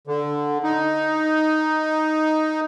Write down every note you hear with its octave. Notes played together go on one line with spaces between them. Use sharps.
D3
D#4